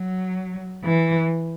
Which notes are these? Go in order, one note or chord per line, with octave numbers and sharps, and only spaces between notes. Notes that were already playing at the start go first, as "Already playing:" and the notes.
Already playing: F#3
E3